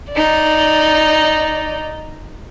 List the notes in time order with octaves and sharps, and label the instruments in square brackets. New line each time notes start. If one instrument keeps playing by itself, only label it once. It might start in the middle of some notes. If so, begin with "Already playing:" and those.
[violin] D#4 D5